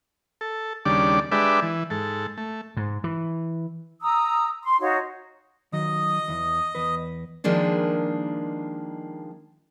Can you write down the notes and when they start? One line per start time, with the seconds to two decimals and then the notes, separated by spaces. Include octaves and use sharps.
0.41 A4
0.85 D#2 C#3 G3 D4 D5
1.32 G#3 D4 G4 B4 D5 E5
1.62 E3
1.90 G#2 A4
2.37 A3
2.77 G#2
3.04 E3
4.00 A#5 D#6 E6
4.61 C6
4.80 D#4 F#4 C#5 F5
5.73 D#3 F#3 D#5 D#6
6.28 E2 E3
6.75 E2 B4
7.44 D#3 F3 G#3 A#3 D4